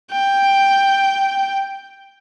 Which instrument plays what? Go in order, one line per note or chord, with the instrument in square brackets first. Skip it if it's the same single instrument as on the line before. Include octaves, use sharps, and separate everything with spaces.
[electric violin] G5